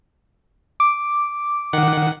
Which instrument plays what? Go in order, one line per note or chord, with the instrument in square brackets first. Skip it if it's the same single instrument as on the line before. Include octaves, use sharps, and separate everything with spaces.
[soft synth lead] D6
[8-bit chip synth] D#3 F#5